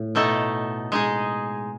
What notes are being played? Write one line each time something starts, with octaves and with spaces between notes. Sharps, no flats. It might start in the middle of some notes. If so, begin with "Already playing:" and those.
Already playing: A2
B2 A3 D#4 A4
G#3 D#4 G#4